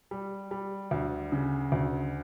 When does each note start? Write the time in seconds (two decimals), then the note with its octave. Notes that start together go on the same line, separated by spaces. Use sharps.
0.11 G3
0.51 G3
0.91 D2
1.32 C#3
1.72 D2